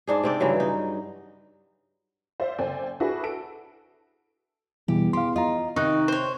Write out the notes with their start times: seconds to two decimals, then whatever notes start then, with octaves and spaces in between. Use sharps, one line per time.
0.07 G#2 D4 G#4
0.23 C3 C4 D5
0.40 G2 C#3 E3 F#3
0.60 D#4
2.40 C5 D5 E5 F5
2.58 F#1 A4 C5 D5 G5 G#5
3.00 D4 E4 F#4 G#4 A4 B4
3.23 A4 D7
4.88 E2 B2 E3 G3 G4
5.13 G4 F5 C6
5.36 F4 D#5 A#5
5.76 C3 D#3 D#4 C#6 F#6
6.08 C5 C#5